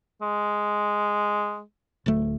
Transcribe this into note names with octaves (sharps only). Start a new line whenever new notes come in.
G#3
D1 D2 A3